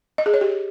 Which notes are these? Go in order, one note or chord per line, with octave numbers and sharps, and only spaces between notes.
D#5
G#4
C#5
G4